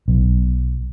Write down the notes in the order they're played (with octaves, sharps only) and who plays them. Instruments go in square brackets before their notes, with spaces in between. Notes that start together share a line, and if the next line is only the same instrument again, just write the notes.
[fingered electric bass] B1